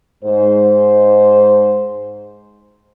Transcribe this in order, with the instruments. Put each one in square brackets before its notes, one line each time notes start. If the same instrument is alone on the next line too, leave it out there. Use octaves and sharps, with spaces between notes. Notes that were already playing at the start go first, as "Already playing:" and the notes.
[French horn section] G#2 C5